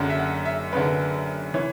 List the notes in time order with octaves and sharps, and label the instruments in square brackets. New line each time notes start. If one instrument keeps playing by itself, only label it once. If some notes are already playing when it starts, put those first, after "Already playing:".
Already playing: [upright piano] F#1 F#2 D3 F#5
E5
F#5
E5
F#1 F#2 D3 B4
E3 C#5